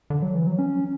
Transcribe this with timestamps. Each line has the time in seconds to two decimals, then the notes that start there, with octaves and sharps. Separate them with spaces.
0.10 D3
0.22 F#3
0.35 E3
0.47 F#3
0.59 C#4